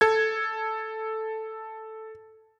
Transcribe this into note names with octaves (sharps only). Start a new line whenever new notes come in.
A4 G#6